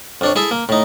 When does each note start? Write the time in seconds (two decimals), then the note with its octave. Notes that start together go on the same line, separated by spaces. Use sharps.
0.21 F2 D4 C#5
0.36 E4 G#4 A4 E5
0.51 A#3
0.69 A2 D#4